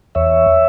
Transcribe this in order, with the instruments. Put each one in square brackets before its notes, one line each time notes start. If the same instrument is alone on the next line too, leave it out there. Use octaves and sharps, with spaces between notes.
[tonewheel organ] E2 C#5 E5